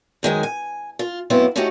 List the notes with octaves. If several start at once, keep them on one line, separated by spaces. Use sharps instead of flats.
F#2 D#3 G#3 G#4
G#5
F4
F#2 A2 B3 C4 E4 F4
A3 C#4 D#4 E4 F#4 G4